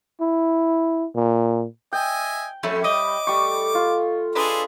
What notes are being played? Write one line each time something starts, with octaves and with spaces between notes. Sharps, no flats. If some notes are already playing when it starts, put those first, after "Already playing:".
E4
A#2
D#5 E5 G5 G#5
F2 A3 C4 C#4 B5
G3 D#5 D6
G3 A3 C#6
F4
D4 G#4 A4 B4 D#5 C6